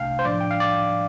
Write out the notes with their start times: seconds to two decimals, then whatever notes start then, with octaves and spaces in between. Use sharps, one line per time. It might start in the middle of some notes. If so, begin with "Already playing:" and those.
Already playing: C2 C3 A3 D4 F5 G5 A5
0.19 C5
0.25 A2 F3 D4 D5
0.41 G5
0.51 F5
0.60 D5